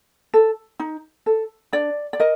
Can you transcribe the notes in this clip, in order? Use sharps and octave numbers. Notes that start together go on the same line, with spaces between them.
A4
D#4
A4
D4 D5
D5
A#4 D#5